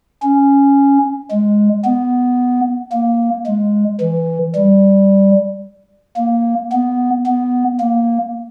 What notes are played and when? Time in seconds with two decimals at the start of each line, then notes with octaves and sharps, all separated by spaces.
0.23 C#4
1.31 G#3
1.85 B3
2.92 A#3
3.46 G#3
4.01 E3
4.55 G3
6.17 A#3
6.72 B3
7.26 B3
7.80 A#3